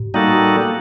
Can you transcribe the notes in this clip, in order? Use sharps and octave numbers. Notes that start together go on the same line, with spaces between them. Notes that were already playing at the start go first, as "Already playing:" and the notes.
Already playing: A2
G3 A#3 D#4 F#4 A4